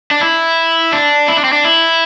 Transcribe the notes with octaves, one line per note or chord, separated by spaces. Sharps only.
D4
E4
D4
E4
D4
C4
D4
E4